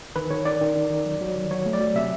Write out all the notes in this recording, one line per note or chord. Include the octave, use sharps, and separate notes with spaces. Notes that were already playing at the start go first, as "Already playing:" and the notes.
D#3 B4
D#3 C#5
D#3 D5
D#3
D#3
D#3
F#3
F#3
D#3
F#3 C#5
A3
D5
F#3
C3 E5